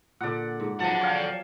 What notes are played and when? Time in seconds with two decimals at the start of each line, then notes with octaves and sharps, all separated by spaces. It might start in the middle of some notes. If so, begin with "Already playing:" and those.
0.20 A#2 D3 D5 F#5
0.60 G#2
0.80 F3 F#3 B3 D5 F#5 A5
1.01 C#5 F5 G5